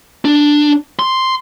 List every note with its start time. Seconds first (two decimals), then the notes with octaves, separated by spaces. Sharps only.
0.25 D4
0.99 C6